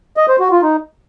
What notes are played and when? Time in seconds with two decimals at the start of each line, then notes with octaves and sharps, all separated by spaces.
0.17 D#5
0.28 C5
0.40 F#4
0.51 F4
0.62 D#4